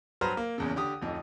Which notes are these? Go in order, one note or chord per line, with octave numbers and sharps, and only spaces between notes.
G2 F#3 B4 C5 A#5 F6
A#3
F#1 E2 C#3
D3 G4 D#6
D1 F2 D#4